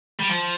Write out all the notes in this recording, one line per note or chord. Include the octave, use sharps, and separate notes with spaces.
G3
F3